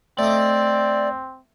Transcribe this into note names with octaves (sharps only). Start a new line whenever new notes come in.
A3 C4 D5 D#5